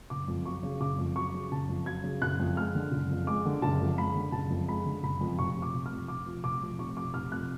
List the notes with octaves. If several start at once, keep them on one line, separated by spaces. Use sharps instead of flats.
F#1 D6
F2
F#3 C#6
C#3
F#1 D6
F2
F#3 C#6
C#3
F#1 A5
F2
F#3 G#6
C#3
F#1 F#6
F2
G#3 F6
D3
F#1
F2
G#3 D6
D3
F#1 A5
F2
G#3 B5
D3
F#1 A5
F2
G#3 B5
D3
F#1 B5
F2
F1 C#6
F3
D6
F1
F6
F2
F1 D6
F3
F1 D6
F2
F1 C#6
F3 D6
F1 F6
F2 F#6